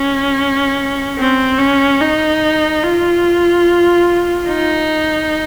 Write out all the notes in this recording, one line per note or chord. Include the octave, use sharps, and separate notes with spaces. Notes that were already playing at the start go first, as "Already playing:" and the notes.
Already playing: C#4
C4
C#4
D#4
F4
D#4